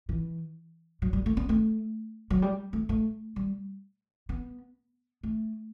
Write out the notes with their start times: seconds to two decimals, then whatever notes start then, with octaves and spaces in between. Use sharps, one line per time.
0.09 E3
1.02 F#3
1.13 G3
1.26 A3
1.37 B3
1.49 A3
2.30 F#3
2.42 G3
2.73 A3
2.89 A3
3.36 G3
4.29 B3
5.23 A3